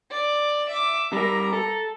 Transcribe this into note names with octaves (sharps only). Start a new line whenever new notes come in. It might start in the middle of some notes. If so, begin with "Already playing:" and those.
D5
E5 D6
G3 A#4 A#5
A4